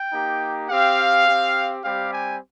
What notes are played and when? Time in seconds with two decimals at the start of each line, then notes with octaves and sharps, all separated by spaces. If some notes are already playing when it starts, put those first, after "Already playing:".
Already playing: G5
0.13 A#3 D#4 G4
0.70 C4 G4 F5
1.27 C4 G4
1.83 G3 C4 G4 F5
2.12 G#5